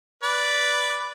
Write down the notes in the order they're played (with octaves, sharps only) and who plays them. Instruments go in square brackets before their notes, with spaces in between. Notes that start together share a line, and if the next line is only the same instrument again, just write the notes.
[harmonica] B4 D5